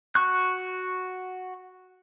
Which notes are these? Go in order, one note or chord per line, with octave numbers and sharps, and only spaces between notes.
F#4 C#6 F#6